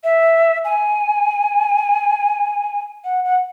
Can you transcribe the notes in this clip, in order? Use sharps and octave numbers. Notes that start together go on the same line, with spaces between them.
E5
G#5
F#5
F#5